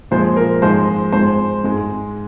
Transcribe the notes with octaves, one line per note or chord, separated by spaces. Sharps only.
A#2 F3 G#3 C5
A#4
G#2 F3 G#3 C5
G#2 G#3 C5
G#2 G#3